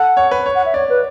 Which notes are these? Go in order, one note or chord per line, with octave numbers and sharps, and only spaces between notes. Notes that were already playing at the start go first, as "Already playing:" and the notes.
Already playing: A4 F#5
C#5
B4
C#5
F#5
E5
C#5 D5
B4